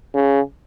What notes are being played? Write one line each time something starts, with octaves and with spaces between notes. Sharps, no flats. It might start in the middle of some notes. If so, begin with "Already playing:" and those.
C#3